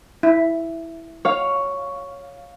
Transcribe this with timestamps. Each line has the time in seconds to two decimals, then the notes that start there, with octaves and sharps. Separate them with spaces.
0.23 E4
1.25 C#5 F5